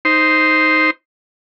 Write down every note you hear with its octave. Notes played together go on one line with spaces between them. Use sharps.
D#4 C5 C6